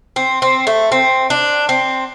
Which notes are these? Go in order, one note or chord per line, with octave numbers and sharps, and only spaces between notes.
C4
C4
A3
C4
D4
C4